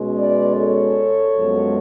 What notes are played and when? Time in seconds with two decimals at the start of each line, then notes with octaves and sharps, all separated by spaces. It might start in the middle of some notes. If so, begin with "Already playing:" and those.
Already playing: B2 G#3 C#4
0.17 B4 D5
0.56 A4 C#5
1.36 F#2 F3 G#3 B3